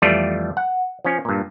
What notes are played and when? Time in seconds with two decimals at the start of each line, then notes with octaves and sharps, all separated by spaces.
0.02 F2 E3 G3 A3 F4 D5
0.57 F#5
1.05 F3 C#4
1.25 G2 A#2